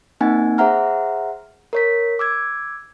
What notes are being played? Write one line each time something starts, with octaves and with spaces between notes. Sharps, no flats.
A#3 C4 D#4 F#5 G#5
G#4 C5 E5 F#5 A#5 F6
A#4 C#5 B6
D6 E6 G#6